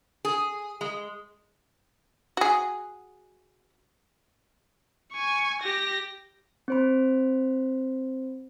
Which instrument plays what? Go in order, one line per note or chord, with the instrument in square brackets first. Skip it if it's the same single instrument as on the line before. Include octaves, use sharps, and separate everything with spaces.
[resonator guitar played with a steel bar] G#4
G#3
[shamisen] F#4 G#4
[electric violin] G#5 C#6
G4 A#6
[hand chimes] C4 C5 B5